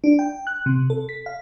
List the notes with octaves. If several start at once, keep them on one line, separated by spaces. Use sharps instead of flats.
D4
G5
F#6
C3
A4
B6
F5